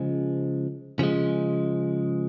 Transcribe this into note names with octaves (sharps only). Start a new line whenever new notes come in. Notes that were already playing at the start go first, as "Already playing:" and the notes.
Already playing: C#3 F3 G#3
C#3 F3 G#3